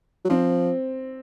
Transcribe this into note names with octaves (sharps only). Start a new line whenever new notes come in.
F#3
F3 C4